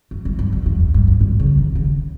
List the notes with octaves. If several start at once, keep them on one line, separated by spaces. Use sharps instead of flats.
F#2
G2
G2
F#2
E2
F#2
G2
G2
A2
C#3
D#3
C#3